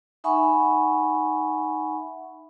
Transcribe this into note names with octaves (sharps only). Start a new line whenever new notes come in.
D#4 E5 F#5 G#5 B5 C#6